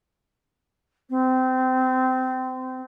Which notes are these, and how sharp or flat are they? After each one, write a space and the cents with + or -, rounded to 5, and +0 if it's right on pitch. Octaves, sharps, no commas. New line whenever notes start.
C4 -25